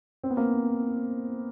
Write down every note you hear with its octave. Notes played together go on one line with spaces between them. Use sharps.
C4
B3
A#3 C4